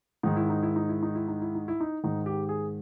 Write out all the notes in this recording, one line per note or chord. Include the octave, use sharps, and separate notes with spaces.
G#2 D#3 D#4
E4
D#4
E4
D#4
E4
D#4
E4
D#4
E4
D#4
E4
D#4
G#2 D#3 D#4
G4
G#4